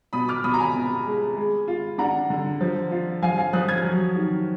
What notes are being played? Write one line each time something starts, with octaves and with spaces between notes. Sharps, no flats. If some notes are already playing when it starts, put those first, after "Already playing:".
B2 B5 D#6
D6 F6
B2 B5 D#6
A#5
G#5 B5
B3
G#3
G#3
F4
D4 F#5 A#5
D3
F3
F4
F3 F5 G#5
F5 G#5
F3 D#6 F#6
F6 G#6
F#3
D#3